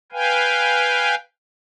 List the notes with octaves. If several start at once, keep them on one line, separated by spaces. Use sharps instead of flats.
B4 F5 G5 G#5